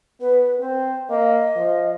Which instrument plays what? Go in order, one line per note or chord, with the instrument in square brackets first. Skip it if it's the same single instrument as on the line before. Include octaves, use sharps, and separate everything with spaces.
[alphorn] B3 [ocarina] B4
[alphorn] C4 [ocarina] C5
[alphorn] A#3 [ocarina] D#5
[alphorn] F3